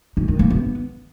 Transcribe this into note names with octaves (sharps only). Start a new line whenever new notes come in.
D#4
D#3
A#3
B3